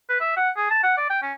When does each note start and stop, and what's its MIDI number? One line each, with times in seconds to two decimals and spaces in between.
0.09 0.17 71
0.21 0.33 76
0.37 0.50 78
0.57 0.66 68
0.70 0.79 81
0.83 0.94 78
0.97 1.07 74
1.10 1.19 79
1.22 1.33 61